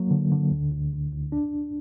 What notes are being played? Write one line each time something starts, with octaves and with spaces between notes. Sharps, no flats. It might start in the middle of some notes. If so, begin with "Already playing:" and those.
Already playing: F#3 A#3
D3
D3
D2
D2
D3
D2
D4